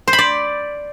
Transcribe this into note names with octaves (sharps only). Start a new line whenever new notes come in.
C5
B5
D5